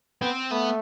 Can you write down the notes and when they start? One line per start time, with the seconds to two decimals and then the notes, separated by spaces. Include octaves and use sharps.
0.21 B3 C4
0.51 A3 B3